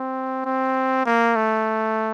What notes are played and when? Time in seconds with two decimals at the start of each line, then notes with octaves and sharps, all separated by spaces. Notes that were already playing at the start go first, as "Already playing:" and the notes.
Already playing: C4
0.45 C4
1.06 A#3
1.36 A3